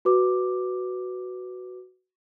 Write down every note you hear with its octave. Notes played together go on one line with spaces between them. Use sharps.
F#4 B4 D6